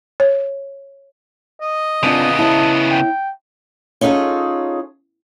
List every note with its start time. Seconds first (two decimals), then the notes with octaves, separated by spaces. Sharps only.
0.20 C#5
1.61 D#5
2.03 C#3 B3 C4 D4 F4
2.39 E4 C#5 A5
2.91 G5
4.01 C#4 D#4 F4 G#4 A4